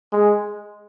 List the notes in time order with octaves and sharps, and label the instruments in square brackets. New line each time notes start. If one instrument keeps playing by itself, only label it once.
[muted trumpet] G#3